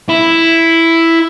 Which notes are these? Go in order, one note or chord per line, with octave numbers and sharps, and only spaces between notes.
E4